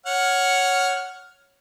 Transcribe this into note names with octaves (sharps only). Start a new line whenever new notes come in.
C#5 F#5 F6